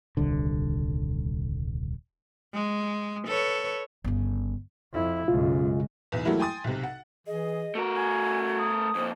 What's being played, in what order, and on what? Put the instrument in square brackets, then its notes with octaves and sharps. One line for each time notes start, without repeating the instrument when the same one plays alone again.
[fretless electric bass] D#1 C2 D3
[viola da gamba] G#3
A4 B4 C#5
[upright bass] G1 C#3
[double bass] F2 E4
[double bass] B1 F#2 [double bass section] C#3 G#3 [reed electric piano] F4
[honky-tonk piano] B1 E2
E3 F#3 G3 A3 A#3 E4
G5 G#5 C6 D#6 A6
B1 C3
F#5
[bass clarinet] E3 [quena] G#4 [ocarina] D#5
[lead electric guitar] A3 A#4 [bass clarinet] F#4
[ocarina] G#5 [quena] G#6
[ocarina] D#6
[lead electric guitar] F2 A#2 [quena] C5